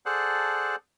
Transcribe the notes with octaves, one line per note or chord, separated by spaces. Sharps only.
G#4 A4 C5 D5 F#5 A5